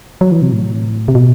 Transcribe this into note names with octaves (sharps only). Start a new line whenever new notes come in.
F#3
E3
C3
A2
C3
B2